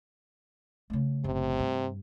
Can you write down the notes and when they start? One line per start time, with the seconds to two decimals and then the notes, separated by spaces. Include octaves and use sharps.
0.90 C#3 A3
1.24 F#1 A2 C3
1.59 G2